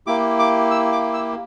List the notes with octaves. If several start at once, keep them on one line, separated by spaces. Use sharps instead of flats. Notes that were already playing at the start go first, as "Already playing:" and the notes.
A#3 E4 G4 D6
D6
E6
D6
E6